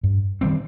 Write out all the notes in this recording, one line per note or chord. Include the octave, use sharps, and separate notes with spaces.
G2
D#3 G3 C4